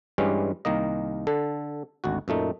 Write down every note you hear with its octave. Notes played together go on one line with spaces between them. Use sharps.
G2 E3 G3 G#3 C#4
C2 D#3 A#3 D#5
D3 A4
G#1 D2 F#4
F#2 A#2 A3 D#4